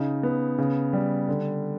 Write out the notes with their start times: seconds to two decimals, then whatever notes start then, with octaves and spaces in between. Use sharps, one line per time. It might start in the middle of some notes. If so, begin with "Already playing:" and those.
Already playing: C#3 D#4
0.23 B3
0.58 C#3
0.93 G3
1.28 D3